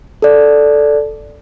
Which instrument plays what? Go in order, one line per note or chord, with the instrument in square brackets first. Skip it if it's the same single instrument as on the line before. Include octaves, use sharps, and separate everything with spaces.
[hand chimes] A4 D5